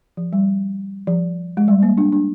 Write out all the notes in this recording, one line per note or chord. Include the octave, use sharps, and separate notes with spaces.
F3
G3
F3
G#3
G3
A#3
D4
D4